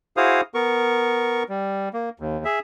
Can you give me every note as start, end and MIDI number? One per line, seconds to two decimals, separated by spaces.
0.17 0.41 64
0.17 0.41 66
0.17 0.41 68
0.17 0.41 72
0.17 0.41 77
0.17 0.41 87
0.54 1.43 59
0.54 1.43 70
0.54 1.43 85
1.49 1.89 55
1.93 2.09 58
2.20 2.44 39
2.45 2.59 68
2.45 2.59 76